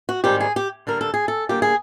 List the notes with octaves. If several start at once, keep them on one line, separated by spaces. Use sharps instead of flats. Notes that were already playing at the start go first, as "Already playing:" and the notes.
F#4
G#2 D#3 G3 C4 G4
G#4
G4
D3 G3 A#3 A#4
A4
G#4
A4
D3 G3 A#3 G4
G#4